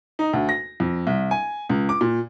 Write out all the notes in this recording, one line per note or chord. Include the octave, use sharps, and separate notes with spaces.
D#4
D2
A#6
F2
C2
G#5
C#2
D6
A#2